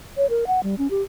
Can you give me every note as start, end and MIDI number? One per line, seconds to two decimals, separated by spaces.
0.17 0.29 73
0.30 0.45 70
0.47 0.63 78
0.63 0.77 55
0.78 0.90 61
0.90 1.02 67